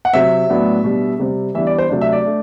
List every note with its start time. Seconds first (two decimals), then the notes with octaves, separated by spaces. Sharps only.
0.05 F#5
0.13 C3 F#3 C4 E5
0.49 A2 F#3 B3 D4
0.84 B2 G3 D4
1.19 C3 G3 C4
1.54 E3 G3 B3 D4 E5
1.67 D5
1.78 C5
1.89 C3 F#3 A3 D4
2.01 E5
2.13 D5
2.25 A3 D4